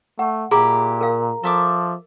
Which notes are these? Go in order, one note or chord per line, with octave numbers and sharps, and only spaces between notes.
A3 F#5
A#2 E4 G4 G#4 A#5 B5 D6
A#4 F5
F3 A4 E5 D6